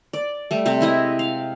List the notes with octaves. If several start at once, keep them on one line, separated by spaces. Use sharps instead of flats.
D5
G3 A3
C3 C4
G#3 E4 D#5
F5